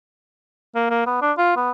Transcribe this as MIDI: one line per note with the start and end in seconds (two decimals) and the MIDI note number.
0.75 0.86 58
0.90 1.05 58
1.07 1.21 59
1.22 1.33 62
1.38 1.53 65
1.56 1.71 59